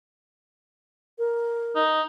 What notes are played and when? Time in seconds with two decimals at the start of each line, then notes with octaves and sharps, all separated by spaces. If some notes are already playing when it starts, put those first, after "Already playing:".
1.18 A#4
1.76 D#4